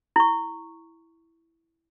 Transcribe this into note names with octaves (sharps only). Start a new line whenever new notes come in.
E4 C#6